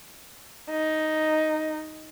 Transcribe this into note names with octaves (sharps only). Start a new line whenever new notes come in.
D#4